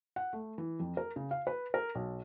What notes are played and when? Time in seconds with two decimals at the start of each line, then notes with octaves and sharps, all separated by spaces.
0.16 F#5
0.33 A3
0.58 E3
0.80 F2
0.97 A#4
1.16 C#3
1.31 F5
1.47 B4
1.74 A#4
1.95 B1